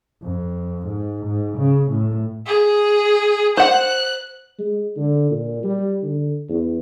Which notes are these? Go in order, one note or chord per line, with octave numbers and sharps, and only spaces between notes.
F2
G#2
G#2
C#3
A2
G#4
C5 F#5 F#6
G#3
D3
A#2
G3
D3
E2